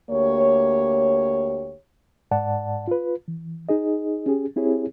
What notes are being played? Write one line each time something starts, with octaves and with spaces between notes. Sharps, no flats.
D2 A#3 G4 C#5
G#2 D5 F#5 A5
F4 B4
E3
D#4 G#4 D#5
C#4 G4 G#4
C4 E4 G4 G#4 C#5